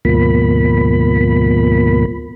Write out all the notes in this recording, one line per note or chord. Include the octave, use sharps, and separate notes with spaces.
D2 G#2 B2 F3 A#3 B5